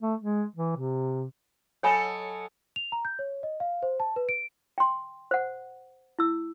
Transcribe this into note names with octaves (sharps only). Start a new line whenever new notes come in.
A3
G#3
E3
C3
F#3 A4 C#5 D#5 G#5 B5
F7
A#5
G6
C#5
D#5
F5
C5
A5
B4
D7
G5 C6
C5 F#5
E4 E6